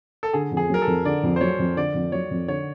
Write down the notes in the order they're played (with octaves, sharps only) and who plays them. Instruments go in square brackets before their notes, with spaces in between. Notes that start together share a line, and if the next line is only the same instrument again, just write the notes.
[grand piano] A4
[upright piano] D3 [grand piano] G#4
[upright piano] F2
[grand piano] G#4
[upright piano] F#3 [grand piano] A#4
[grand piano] A4
[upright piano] F2
[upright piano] D3 [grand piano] D5
[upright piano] F2
[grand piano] C5
[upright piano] F#3 [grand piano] C#5
[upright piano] F2
[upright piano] D3 [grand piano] D5
[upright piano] F2
[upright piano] F#3 [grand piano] C#5
[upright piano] F2
[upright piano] D3 [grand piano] C#5